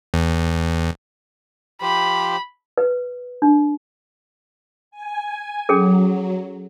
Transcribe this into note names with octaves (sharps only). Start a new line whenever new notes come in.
E2
F3 G4 C5 B5
B4
D4
G#5
F#3 C#4 G#4 A4